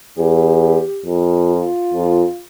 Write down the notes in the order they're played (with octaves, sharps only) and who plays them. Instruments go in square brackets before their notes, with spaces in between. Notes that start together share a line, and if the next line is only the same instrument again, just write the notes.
[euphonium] E2 [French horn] G4
[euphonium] F2
[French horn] F4
[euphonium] F2